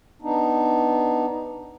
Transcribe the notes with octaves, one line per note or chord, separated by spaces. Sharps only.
B3 D4 D#4